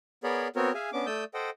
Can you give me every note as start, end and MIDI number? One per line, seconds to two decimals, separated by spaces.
0.24 0.48 59
0.24 0.48 68
0.24 0.48 70
0.24 0.48 73
0.24 0.48 74
0.24 0.48 83
0.56 0.72 59
0.56 0.72 60
0.56 0.72 66
0.56 0.72 70
0.56 0.72 73
0.74 0.90 68
0.74 0.90 76
0.74 0.90 77
0.74 0.90 80
0.93 1.06 59
0.93 1.06 61
0.93 1.06 62
0.93 1.06 86
1.06 1.24 57
1.06 1.24 74
1.06 1.24 87
1.06 1.24 88
1.06 1.24 91
1.34 1.50 69
1.34 1.50 72
1.34 1.50 75
1.34 1.50 78
1.34 1.50 79